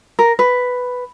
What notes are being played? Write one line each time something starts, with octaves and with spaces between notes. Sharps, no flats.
A#4
B4